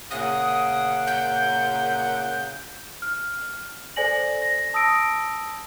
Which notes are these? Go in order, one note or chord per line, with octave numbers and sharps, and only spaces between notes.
A#2 C#3 F#5 D#6
G6
F6
A4 C5 D5 G#5 A#6 F#7
A#6
A5 D#6 E6 A#6 D7